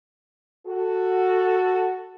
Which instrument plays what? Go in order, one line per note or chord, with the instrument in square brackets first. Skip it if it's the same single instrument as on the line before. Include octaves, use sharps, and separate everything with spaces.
[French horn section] F#4 A4